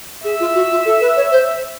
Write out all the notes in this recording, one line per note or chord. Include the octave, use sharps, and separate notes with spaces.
G#4 E5
F4
F#4
F4
A4
B4
C#5
C5